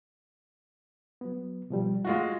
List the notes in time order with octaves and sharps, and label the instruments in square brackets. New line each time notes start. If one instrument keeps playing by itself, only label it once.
[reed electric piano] F#3 B3
B2 F3 G3
[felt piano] G#3 F4 F#4 [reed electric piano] F#5